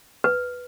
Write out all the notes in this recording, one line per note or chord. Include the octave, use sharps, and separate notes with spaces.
B4